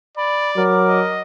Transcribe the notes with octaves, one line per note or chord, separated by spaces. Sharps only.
D5 B5
F#3 A#4 D6
D#5